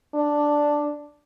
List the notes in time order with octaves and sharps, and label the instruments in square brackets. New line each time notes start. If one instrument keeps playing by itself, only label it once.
[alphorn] D4